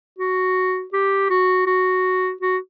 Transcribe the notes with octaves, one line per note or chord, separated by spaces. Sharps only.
F#4
G4
F#4
F#4
F#4